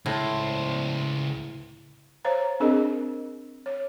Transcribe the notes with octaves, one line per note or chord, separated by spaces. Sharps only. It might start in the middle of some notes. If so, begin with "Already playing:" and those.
C#2 A2 C5
C5 C#5 F5 A#5
C4 D4 G#4 A#4 D#5
C#5